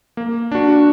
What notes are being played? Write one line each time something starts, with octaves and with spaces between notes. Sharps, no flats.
A#3
D4 F#4